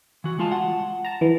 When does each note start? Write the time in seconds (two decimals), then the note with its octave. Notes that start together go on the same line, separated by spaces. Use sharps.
0.24 E3 F#4
0.39 G#3 F4 A5
0.52 F#5
1.05 A5 A#5
1.21 E3